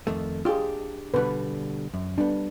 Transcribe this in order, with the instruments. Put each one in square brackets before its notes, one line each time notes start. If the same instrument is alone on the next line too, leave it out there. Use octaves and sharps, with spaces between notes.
[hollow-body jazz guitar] F2 D#3 A3
[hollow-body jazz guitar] D4 G4 [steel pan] F4 G#4
[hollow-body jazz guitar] B2 D3 G3 [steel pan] B4
[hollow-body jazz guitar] F#2
[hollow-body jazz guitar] G3 B3 [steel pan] D4